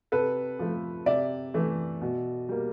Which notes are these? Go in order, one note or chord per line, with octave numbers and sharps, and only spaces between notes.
C3 A4 B4
F3 A3
C3 D5 E5
E3 A3
B2
G3 A#3